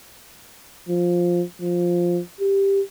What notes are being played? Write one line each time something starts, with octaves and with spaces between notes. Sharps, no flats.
F3
F3
G4